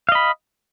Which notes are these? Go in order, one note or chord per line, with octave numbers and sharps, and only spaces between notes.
D#5 F5 B5